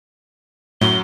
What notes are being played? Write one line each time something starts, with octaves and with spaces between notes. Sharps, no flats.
F#2 A2 F#3 G7